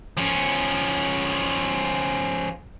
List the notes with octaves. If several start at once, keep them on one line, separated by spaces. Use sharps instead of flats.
F3 C#4